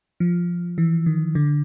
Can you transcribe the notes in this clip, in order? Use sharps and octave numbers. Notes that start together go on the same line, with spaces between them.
F3
E3
D#3
D3